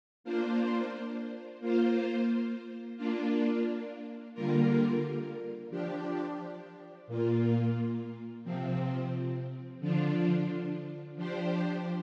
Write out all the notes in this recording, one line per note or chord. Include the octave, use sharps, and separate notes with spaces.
A#3 D4 F4 C5
A#3 F4 C5
A#3 D4 F4
D3 G3 A#3 F4 A#4
F3 D4 G4
A#2 A#3 F4
C3 F3 C4
D3 F3 D4 F4
F3 D4 G4 C5